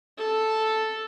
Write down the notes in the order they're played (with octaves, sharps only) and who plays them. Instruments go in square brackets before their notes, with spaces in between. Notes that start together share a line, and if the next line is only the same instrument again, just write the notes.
[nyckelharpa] A4